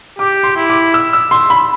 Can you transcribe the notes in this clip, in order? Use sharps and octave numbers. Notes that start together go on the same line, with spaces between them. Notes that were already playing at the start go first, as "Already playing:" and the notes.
G4 D6
C6
E4
D6
E6
E6
C6
B5